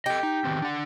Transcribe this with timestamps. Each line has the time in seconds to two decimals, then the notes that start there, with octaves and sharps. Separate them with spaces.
0.06 G4 A4 D#5
0.23 D#4
0.44 D#3 B3 C4
0.62 D4 F#5